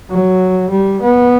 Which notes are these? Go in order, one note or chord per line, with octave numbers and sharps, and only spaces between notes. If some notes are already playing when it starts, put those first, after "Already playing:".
F#3
G3
B3